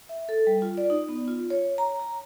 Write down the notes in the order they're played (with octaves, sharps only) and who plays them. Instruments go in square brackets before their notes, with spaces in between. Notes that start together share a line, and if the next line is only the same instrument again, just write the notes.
[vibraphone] E5
A4
G3
F4
D5
D#4
B3
F4
C#5
A#5
A#5